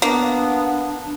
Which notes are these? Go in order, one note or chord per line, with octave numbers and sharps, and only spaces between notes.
A#3 B3 D4